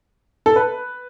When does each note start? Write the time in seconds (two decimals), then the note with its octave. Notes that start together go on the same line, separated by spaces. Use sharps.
0.46 A4
0.56 B4